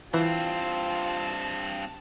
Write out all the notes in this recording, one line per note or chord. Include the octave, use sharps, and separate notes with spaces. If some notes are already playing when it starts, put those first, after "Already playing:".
G2 E3 C4 F4 A5